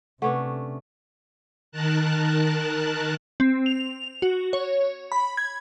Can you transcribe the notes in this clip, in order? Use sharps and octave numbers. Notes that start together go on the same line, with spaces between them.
C3 A3 C#4 D4 B4 F#5
D#3 A#4 A5 F#6
C4
F7
F#4
C#5
B5
G#6